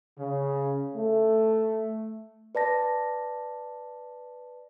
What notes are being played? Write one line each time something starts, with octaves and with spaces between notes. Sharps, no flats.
C#3
A3
B4 D5 A5 A#6